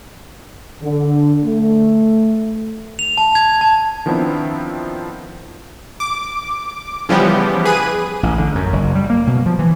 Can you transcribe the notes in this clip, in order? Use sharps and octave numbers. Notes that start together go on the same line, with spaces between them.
D3
A3
F7
A5
G#6
A5
D#3 F3 B3 C4 D4 E4
D6
C#3 E3 F3 G3 B3 G4
G#4 B4 D#7
A1
D3
F#2
F#1
G3
A#3
B2
F3
E3